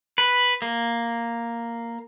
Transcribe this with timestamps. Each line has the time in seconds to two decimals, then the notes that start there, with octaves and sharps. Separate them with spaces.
0.18 B4
0.62 A#3